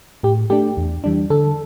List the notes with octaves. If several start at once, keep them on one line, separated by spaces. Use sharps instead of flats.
A2 G4
A3 D4 G4
E2
E3 G3 D4
D3 A4